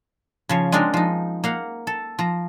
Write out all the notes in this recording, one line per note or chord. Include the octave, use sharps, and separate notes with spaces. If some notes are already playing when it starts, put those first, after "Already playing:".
C#3 F3 C#5
G#3 C4 D4 D#4 A#4
F3 D#4
A#3 F5 F#5
A4
F3 A#5